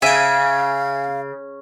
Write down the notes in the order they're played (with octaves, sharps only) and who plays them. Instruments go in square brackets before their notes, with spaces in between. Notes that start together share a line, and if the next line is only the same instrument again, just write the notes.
[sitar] C#3 [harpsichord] E5 G5 [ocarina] F5 [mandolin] G#5